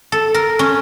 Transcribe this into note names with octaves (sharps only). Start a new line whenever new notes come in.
A4
A#4
C#4